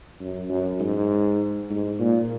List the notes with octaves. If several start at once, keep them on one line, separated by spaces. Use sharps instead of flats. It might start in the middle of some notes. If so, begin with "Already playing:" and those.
F#2
F#2
G#2
G#2
A#2